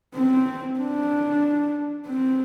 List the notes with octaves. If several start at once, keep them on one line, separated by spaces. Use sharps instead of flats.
C4
D4
C4